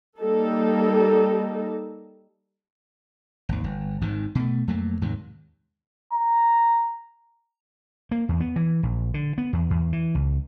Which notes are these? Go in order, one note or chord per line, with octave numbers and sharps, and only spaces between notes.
G3 A#3 D#4 A4
G#1 D#2
G1
G#1 G#2 D#3
B2 A3
F2 F#3 A3 A#3
D#2 G#2 C3 D#3
A#5
A#3
E2
B3
E3
A#1
D3
B3
E2
E2
E3
C#2